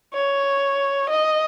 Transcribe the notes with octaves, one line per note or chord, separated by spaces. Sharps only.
C#5
D#5